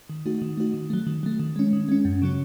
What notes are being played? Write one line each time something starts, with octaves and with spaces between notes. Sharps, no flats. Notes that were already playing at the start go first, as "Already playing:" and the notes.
D#3
A3 D#4 F#4
D#3
A3 D#4 F#4
D#3
F#3 A3
D#3
F#3 A3
D#3
G#3 C#4
D#3
G#3 C#4
F#2
C#3 F#3 C#4